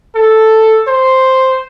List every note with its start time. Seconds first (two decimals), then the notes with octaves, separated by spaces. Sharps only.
0.15 A4
0.87 C5